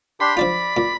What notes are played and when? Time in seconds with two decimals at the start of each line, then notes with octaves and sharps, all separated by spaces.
0.20 D4 G4 B5 C6
0.37 F3 D4 F4 D5
0.77 A#2